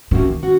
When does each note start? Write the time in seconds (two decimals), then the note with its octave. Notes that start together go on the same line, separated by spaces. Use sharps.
0.11 C3 D#3 F3 A#3 C#4 F#4
0.43 C#4 F#4